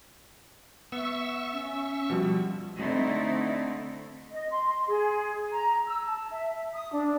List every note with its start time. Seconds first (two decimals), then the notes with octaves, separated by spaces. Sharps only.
0.92 B3 E5 C#6 E6
1.53 C#4
2.10 B2 F3 G3 F#4
2.78 D3 A3 C4 D#4 E4
4.32 D#5
4.51 C6
4.66 C6
4.88 G#4
5.52 A#5
5.86 E6
6.08 A5
6.30 E5
6.74 D#6
6.93 D4